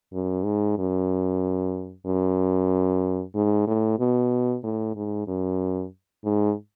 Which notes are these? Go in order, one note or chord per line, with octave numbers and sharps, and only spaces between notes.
F#2
G#2
F#2
F#2
G#2
A2
B2
A2
G#2
F#2
G#2